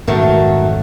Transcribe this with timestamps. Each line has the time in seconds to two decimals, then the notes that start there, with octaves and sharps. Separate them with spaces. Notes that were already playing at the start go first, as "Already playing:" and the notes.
0.07 G#1 F2 A#2 D#3 F#3 A3